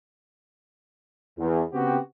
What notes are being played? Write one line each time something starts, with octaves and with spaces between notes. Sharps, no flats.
E2
C#3 B3 C4 F#4 G4